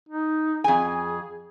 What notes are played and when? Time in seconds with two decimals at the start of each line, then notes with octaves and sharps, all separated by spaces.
0.09 D#4
0.64 F2 G#4 G#5